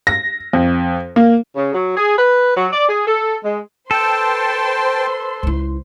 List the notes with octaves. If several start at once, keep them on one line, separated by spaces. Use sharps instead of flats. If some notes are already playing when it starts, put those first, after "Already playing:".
A#6
F2
A#3
C#3
F#3
G#4
B4
F#3
D5
G#4
A4
G#3
A4 B4 C5 G5 A5 C6
C#2 E4